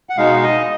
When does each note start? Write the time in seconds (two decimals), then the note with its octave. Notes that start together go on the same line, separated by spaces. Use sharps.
0.10 F#5
0.17 B2 G#3 D#4 F5
0.44 D#5